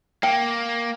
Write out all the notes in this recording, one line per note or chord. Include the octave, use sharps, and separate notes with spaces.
A#3 G5